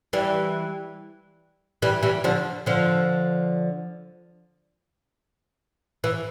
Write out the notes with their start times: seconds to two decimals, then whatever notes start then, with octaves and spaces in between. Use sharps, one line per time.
0.13 E3 G3
1.82 E3 G3
2.03 E3 G3
2.24 D3 F3
2.66 D3 F3
6.04 E3